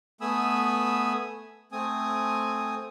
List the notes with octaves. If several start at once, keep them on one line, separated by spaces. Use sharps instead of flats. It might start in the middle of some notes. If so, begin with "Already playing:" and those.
A3 B3 G#5 B5 D#6 E6
A3 C4 G#5 D#6